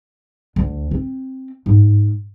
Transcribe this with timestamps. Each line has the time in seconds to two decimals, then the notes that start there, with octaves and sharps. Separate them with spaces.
0.56 D2
0.91 C4
1.66 G#2